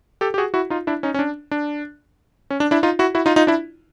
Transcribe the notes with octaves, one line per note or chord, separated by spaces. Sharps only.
G4 A4
G4
F#4 G#4
E4 F#4
D#4 F4
D4 E4
C#4 D#4
C#4
D4
D4
C#4
D4
D4 E4
D#4 F4
E4 F#4
E4 F#4
D#4 F4
D#4 F4
D4 E4